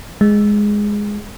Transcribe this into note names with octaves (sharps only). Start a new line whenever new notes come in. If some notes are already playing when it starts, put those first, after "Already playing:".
G#3